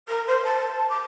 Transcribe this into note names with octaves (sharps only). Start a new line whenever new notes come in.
A#4
C5
A5
D6